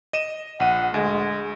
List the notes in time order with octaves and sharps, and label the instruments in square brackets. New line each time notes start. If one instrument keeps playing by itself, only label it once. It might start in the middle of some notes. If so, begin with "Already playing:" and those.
[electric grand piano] D#5 D#7 E7
[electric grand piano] A#1 D#7 [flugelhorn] F#5
[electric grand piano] D2 [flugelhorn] G#3